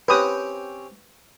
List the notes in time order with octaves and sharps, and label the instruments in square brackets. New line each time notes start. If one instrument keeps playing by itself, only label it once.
[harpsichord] C4 C#4 G4 [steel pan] B4 D#6